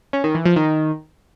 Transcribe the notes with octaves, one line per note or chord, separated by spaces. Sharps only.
C#4
D#3
E3
F3
D#3